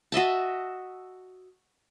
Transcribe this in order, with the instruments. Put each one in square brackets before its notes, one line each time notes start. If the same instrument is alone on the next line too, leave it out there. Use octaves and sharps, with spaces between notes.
[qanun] F#4 D#5 E5 A5